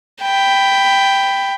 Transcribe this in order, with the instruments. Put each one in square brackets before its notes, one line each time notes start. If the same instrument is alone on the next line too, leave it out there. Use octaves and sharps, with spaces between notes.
[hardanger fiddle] G5 B5